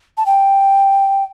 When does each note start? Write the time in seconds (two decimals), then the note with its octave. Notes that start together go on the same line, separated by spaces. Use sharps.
0.17 A5
0.26 G5